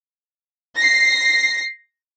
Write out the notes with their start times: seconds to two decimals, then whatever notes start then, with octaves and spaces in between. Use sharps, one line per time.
0.77 A#6 C7